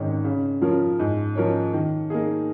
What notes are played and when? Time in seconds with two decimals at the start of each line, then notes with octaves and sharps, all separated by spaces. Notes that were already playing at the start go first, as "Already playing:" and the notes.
Already playing: G#1 G#2 D#3 C#4
0.24 C#3
0.61 F3 C#4 F4 A#4
0.99 G#2
1.35 F3 C#4 A#4 C#5
1.73 D#3
2.10 A#3 D#4 G#4